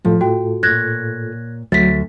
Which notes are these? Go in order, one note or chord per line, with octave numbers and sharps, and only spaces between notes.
A2 F3 F4 A4
F#4 G5
A#2 C#5 F#6 G#6 A#6
D2 F#3 E5 A6 B6